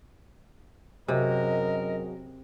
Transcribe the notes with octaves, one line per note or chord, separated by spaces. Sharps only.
F#2 C3 F#3 F#4 G#4 A#4 D#5